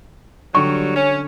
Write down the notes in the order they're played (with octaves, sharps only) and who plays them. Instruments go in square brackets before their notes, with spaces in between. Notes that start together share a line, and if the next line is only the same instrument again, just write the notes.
[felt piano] D3 C#6 [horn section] F#3 G3
[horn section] C#4